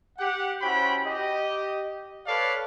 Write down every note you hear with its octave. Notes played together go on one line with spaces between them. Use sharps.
G4 F#5
C#4 E4 F#4 C5 G5 B5
G4 D#5
A4 B4 C#5 D5 F5